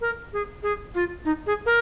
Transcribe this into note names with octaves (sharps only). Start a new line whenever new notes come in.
A#4
G#4
G#4
F4
D#4
G#4
A#4